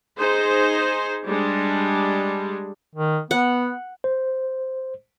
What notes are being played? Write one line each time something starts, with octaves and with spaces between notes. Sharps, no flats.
D#4 G#4 C5
G3 G#3 D4
D#3
B3 F#5
C5